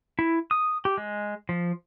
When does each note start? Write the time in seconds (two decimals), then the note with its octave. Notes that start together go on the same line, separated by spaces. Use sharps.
0.19 E4
0.51 D#6
0.85 G4
0.98 G#3
1.49 F3